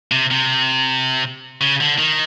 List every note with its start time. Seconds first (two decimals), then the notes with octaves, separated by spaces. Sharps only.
0.12 C3
0.31 C3
1.61 C#3
1.80 D3
1.99 D#3